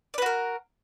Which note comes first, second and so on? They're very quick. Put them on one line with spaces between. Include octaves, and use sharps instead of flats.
D5 B4 F#4 A#4